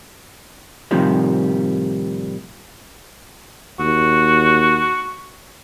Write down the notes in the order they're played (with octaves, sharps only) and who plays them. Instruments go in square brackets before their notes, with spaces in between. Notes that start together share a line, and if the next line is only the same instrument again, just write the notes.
[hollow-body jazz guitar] A2 C3 D#3 F3 G3
[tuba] D#2 [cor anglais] F#4